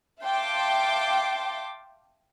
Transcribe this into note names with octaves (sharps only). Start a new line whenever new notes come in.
E5 F5 G5 A5 C6 D6